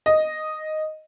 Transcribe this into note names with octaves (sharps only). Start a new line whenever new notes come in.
D#5